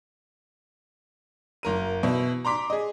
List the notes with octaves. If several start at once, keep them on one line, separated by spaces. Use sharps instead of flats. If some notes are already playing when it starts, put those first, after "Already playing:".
F#1 A#4 D#7
B2 E3 E4
A#5 C6 D6 B6
G#4 D#5